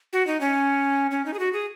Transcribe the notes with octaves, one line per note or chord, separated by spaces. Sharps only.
F#4
D#4
C#4
C#4
D#4
G#4
F#4
G#4